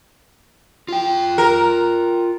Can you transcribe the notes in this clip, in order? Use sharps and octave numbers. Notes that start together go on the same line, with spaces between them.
F4 G5
A#4